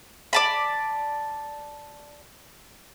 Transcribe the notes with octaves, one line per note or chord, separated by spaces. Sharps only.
D5 A5 B5